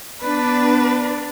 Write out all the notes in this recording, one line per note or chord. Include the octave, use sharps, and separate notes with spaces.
B3 D4 B4